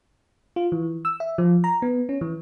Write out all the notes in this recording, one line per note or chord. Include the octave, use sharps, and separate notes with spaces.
F4
E3
E6
E5
F3
A#5
B3
C#4
E3